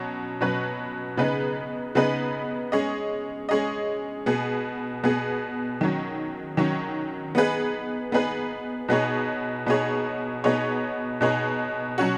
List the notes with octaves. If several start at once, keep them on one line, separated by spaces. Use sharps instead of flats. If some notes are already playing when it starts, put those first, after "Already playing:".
Already playing: B2 F#3 C#4
B2 F#3 C#4 B4
C#3 B3 D#4 G#4 B4
C#3 B3 D#4 G#4 B4
G#3 C#4 G#4 D#5
G#3 C#4 G#4 D#5
B2 B3 G#4
B2 B3 G#4
D#3 F#3 C#4
D#3 F#3 C#4
B3 D#4 G#4 B4
B3 D#4 G#4 B4
B2 B3 D#4 G#4 C#5
B2 B3 D#4 G#4 C#5
B2 B3 D#4 G#4 C#5
B2 B3 D#4 G#4 C#5
B2 F#3 C#4 F#4